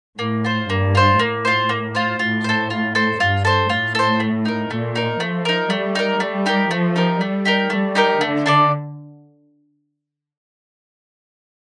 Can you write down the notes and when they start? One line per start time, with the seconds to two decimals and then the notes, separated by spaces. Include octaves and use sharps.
0.19 A2 A#3
0.45 F4 C5
0.69 G2 A#3
0.95 F4 C5
1.19 A2 A#3
1.45 F4 C5
1.69 A#3
1.95 F4 C5
2.19 A2 F4
2.44 A4 C5
2.70 F4
2.95 A4 C5
3.20 G2 F4
3.45 A4 C5
3.70 A2 F4
3.95 A4 C5
4.20 A3
4.45 D#4 A#4
4.70 A#2 A3
4.96 D#4 A#4
5.20 F3 A3
5.45 D#4 A#4
5.70 G3 A3
5.95 D#4 A#4
6.20 G3 A3
6.46 D#4 G4 A#4
6.71 F3 A3
6.96 D#4 G4 A#4
7.20 G3 A3
7.45 D#4 G4 A#4
7.70 G3 A3
7.95 D#4 G4 A#4
8.21 D3 A3
8.46 D4 A4 D5